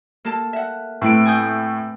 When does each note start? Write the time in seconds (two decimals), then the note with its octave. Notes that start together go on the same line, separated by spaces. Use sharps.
0.25 A#3 A4 A5
0.53 E5 F#5
1.02 A2 A3 C4 B4 D7
1.25 G#5 D#6 G6